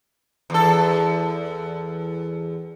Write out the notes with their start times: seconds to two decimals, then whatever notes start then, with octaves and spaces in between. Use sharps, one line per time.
0.50 E2 A4